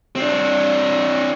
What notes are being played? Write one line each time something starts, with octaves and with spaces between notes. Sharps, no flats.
C4 D4